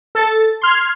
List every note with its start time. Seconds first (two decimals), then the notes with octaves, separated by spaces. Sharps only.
0.15 A4 A6
0.62 C6 F6 G#6